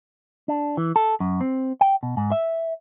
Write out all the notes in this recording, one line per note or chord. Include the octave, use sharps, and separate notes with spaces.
D4
E3
A4
F#2
C4
G5
B2
G#2
E5